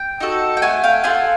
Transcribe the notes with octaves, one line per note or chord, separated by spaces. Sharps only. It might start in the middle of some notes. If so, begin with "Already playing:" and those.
Already playing: G5
D#4 F#4 A4
G5
A3 F#5 G#5
F5 G5
D4 F4 A4 F#5 G#5